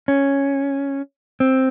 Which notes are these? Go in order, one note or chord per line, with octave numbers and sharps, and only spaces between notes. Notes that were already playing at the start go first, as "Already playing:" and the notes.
C#4
C4